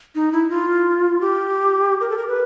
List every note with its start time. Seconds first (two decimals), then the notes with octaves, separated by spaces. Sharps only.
0.15 D#4
0.32 E4
0.50 F4
1.21 G4
2.00 A#4
2.10 A4
2.18 A#4
2.28 B4